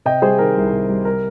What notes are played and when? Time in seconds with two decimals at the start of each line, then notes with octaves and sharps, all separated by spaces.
0.05 C3 D#5 G5
0.22 G3 G#4 C5
0.39 D#3 A#4
0.56 C2
0.72 C3
0.89 G3
1.05 A#4